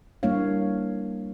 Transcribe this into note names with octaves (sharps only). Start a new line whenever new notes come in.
G3 A#3 D4 E4 C#5 F5